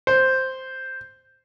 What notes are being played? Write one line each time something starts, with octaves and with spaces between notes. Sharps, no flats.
C5